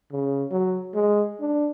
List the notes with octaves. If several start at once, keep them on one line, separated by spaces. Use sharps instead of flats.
C#3
F#3
G#3
D4